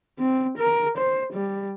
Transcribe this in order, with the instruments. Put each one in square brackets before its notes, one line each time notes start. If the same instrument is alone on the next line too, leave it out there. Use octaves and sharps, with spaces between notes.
[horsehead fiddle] C4
A#4
C5
G3